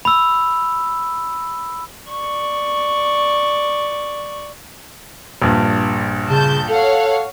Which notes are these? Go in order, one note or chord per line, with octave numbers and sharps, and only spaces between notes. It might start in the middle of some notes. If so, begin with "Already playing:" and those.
B5 E6
D5 C#6
A#1 G2
C#3 A5 G6
A4 C#5 F5 F#5